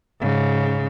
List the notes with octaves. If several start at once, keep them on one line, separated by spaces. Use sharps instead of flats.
G#2 C#3